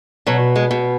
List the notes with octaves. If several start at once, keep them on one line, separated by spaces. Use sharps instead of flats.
B2 F#3
G#3
B2